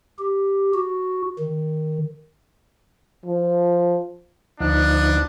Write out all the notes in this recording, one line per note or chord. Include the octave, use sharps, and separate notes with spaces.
G4
F#4
D#3
F3
D2 F3 B3 D4 D#4 F#6